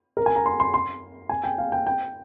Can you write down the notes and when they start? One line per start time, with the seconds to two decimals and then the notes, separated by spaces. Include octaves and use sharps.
0.17 A#4
0.26 G#5
0.36 A#5
0.46 C6
0.60 C6
0.74 C6
1.29 G#5
1.44 G5
1.58 F5
1.72 G5
1.87 G5